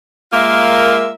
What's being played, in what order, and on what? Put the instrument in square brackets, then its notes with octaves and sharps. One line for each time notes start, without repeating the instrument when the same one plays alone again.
[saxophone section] G#3 A#3 F4 A#4 E5